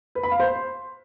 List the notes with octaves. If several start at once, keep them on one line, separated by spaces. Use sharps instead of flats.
B4
B5
F5
C5
C6